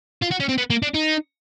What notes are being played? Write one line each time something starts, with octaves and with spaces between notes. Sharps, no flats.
F4
F#4
C#4
C4
B3
A#3
D4
D#4